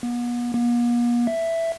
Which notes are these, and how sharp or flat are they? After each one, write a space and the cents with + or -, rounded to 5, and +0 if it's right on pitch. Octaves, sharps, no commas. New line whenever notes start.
B3 -40
A#3 +45
E5 +5